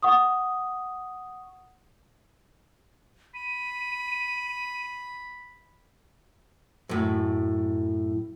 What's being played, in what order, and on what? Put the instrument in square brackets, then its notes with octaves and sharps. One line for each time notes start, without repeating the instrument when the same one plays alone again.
[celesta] F#5 C#6 D#6
[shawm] B5 [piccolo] D#7
[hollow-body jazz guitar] F#2 A2